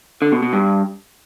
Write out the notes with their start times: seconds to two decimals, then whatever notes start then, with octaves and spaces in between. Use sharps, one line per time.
0.22 D3
0.32 B2
0.42 B2
0.53 G2